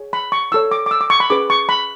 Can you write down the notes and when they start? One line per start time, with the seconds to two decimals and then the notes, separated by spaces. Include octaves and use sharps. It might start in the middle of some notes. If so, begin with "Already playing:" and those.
Already playing: G#4 C#5
0.13 B5
0.32 C#6
0.52 E4 A4 C#5 E6
0.71 D6
0.86 D6
0.91 E6
1.01 D6
1.10 C#6
1.20 B5
1.30 C#4 G#4 B4 D6
1.50 C#6
1.69 B5